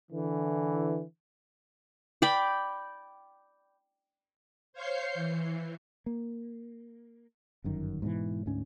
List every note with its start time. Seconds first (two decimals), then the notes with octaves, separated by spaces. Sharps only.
0.11 D3 E3
2.22 D5 G5 B5
4.73 C5 C#5 F5 C#6 G6 C7
5.14 E3
6.06 A#3
7.64 G1 F#2 D#3
8.02 G#2 B2 D3 E3
8.46 D2 G#2 C#4